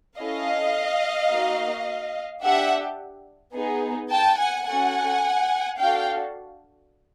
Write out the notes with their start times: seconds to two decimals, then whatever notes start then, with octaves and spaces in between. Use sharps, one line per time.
0.18 C#4 E4 A4 D#5 F5
1.31 A#3 D#4 F#4
2.43 D4 G4 E5 F#5
3.55 B3 D#4 G#4
4.11 G5 A5
4.39 F#5 G#5
4.67 C#4 F#4 A4 F#5 G#5
5.79 D4 F#4 A4 F5 G5